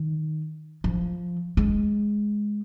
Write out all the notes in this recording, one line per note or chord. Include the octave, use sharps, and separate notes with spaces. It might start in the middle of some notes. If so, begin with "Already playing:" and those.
Already playing: D#3
F3
G#3